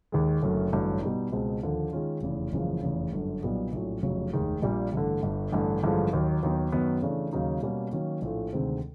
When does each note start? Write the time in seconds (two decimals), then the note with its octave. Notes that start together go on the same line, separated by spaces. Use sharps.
0.12 D#2 D#3 G#3
0.42 F#1 F#2 D3 F#3 A3
0.72 A1 G2 D3 F#3
1.02 B2 G3 B3 D#4
1.32 C#2 B2 G#3 C4
1.63 D#2 D3 F3
1.93 D#3 G#3 C#4 F4
2.23 F1 E2 C#3 E3
2.52 F#1 E2 C#3 F3 G#3
2.83 F1 E2 C#3
3.12 G1 F#2 D3
3.43 B1 A#2 G3 B3
3.73 A#1 A2 F#3
4.03 F1 F2 C#3 F#3
4.33 F1 D#2 D#3 G#3
4.63 A#1 A#2 G3 A#3
4.93 A1 G2 D3
5.23 G1 G2 D3
5.52 A1 G2 D3
5.83 A1 G2 D3 F3 G#3
6.13 D#2 D#3 F#3
6.43 D#2 D#3 F#3 B3 D#4
6.72 F#2 D#3 F#3 B3
7.02 C#3 E3 A3 D4
7.33 D#2 C#3 F#3 A#3 D#4
7.62 B2 G3 A#3 C#4
7.93 D#3 F#3 A#3 C#4
8.22 A#1 A2 F3 A3
8.53 D2 C3 D#3 G#3 C4